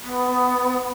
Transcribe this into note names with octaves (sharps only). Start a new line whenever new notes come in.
B3